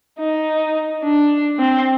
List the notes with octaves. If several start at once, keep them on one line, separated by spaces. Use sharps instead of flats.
D#4
D4
C4